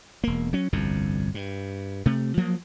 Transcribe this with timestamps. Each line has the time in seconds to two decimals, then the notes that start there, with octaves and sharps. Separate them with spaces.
0.24 E1 A#3
0.53 F#3 C#4
0.73 G1 C2 F2 D3
1.34 G2
2.06 C3 A3
2.37 F3 F#3 A#3